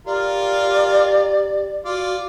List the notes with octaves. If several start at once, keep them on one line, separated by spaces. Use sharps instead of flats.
F4 G4 A#4 D5
F4 F#4 D5